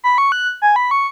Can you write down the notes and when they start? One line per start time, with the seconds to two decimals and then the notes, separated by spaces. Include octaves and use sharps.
0.04 B5
0.18 C#6
0.32 F#6
0.62 G#5
0.76 B5
0.91 C#6